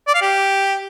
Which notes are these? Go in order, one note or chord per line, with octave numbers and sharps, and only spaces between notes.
D5
F5
G4